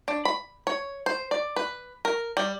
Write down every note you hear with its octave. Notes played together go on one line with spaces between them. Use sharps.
D4
B5
C#5
C5
D5
B4
A#4
G3